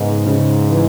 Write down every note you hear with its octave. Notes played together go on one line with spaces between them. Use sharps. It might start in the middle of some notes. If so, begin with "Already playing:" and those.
Already playing: G#2 C#3 B3
C#3
E3